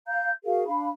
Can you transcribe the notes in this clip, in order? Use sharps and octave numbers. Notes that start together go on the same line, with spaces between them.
F5 A#5 G6
F#4 G#4 A#4 F5
D4 F5 B5